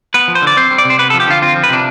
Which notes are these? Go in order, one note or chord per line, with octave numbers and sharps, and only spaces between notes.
B3 B4
F3
C5
D3
D5
C4 C5
G3
D5
C3
C5
B3 B4
F3 A4
G4
D3 F4
C4 F4
F3
B4
C3 D4